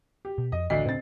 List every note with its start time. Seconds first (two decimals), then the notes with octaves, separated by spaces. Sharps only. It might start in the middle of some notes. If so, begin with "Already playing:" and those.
0.25 G4
0.38 B2
0.52 F2 D#5
0.70 A1 D2 D4 D#5 C7
0.85 A2 C#3 C4 D4 A6